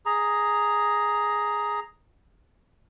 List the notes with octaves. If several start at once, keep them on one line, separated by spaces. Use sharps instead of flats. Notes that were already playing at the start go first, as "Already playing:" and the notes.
G#4 A#5